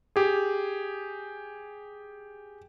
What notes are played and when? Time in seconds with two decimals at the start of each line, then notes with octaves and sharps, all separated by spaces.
0.16 G4 G#4